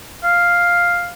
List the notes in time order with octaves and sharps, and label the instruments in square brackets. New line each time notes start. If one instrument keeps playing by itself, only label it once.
[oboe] F5